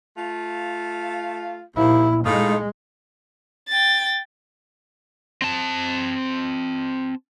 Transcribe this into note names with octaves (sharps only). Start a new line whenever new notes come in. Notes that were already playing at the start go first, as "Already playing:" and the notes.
A3 F4
D#2 A#2 F3 E4
A2 G#3 D#4 F4
G5 A6
C4 A5